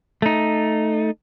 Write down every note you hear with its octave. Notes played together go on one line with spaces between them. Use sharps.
A3 D#4